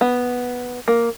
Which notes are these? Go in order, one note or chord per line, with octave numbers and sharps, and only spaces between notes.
B3
A#3